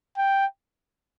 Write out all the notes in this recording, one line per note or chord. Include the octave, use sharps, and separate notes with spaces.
G5